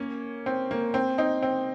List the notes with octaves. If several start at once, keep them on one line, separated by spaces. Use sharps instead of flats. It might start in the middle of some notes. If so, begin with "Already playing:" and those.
Already playing: A#3 C#4
C4
A#3
C4
C4 D#4
C4